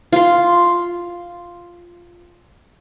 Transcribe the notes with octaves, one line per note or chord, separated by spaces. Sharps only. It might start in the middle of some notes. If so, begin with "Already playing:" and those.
F4 C6